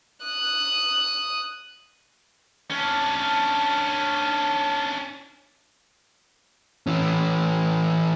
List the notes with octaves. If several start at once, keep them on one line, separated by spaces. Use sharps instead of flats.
D#6 F#6
C#4 D4
E3 C#4